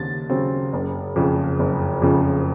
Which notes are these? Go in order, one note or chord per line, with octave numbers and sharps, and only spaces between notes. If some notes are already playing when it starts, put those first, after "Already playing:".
Already playing: D#2 C#3 C4 A6
C#3 F#3 C4
F#1
F2 C#3 F3
F#1
F2 C#3 F3